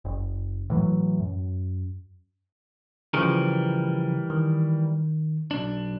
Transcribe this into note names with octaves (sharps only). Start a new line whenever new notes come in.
F#1
A2 E3 F#3
F#2
C#3 E3 F3 G3 A#4
D#3
B1 D4